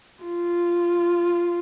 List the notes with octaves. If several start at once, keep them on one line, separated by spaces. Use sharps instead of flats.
F4